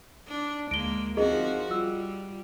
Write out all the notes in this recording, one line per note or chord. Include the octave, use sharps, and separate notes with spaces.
D4
D2 G#3 A#3 A#6 D7 G7
F3 C4 D#4 F#4 G#4 A#4 D#5
G3 F4 E6